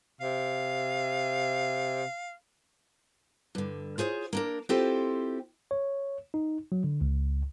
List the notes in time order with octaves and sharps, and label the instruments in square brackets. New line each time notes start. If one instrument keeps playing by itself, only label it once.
[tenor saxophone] C3 [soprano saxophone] F5
[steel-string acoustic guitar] G2 D3
F4 G#4 C5 C#5
A#3 D4 A#4
C4 E4 F4 G4 A4 C5
[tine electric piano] C#5
D#4
F#3
D3
C#2